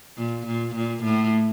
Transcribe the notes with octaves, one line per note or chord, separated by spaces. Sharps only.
A#2
A#2
A#2
A2